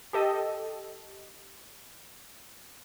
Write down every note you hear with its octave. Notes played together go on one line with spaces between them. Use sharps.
G4 A4 D#5